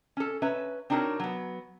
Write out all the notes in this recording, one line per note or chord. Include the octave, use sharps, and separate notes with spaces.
C#4 A4
C#4 B4 E5 A#5
C4 D4 D#4 F#4 A#4 C#5
F#3 B3